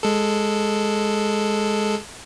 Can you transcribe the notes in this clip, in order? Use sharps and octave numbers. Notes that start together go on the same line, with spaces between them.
G#3 A4